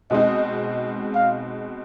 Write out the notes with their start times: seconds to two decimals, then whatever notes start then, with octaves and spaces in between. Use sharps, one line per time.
0.10 B2 G#3 C4 D#4 D#5
1.15 F5